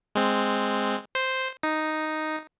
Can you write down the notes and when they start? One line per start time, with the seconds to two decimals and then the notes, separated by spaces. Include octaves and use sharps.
0.15 G#3 C4
1.15 C5
1.63 D#4